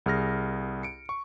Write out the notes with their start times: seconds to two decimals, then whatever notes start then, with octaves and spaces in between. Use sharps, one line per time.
0.06 C2 G#4 F6 A#6
0.83 C#7 D7
1.09 C#6